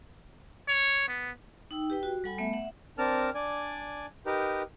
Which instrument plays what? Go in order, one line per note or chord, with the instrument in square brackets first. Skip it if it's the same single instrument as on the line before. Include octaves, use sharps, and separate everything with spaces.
[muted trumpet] C#5
B3
[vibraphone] D#4 G5 E6
G4 B4 G5
F#4
G3 A4 F#5 G#5 B5
A3 B3 E5
E5 F#5
[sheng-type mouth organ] C4 D4 A#4 A5 F6
D4 D5 G#5
D#4 G4 A#4 B4